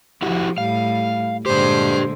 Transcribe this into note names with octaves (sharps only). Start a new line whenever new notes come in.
F3 E4 F#4 G4
A2 G3 F5
A#2 D3 G#3 D4 G4 C5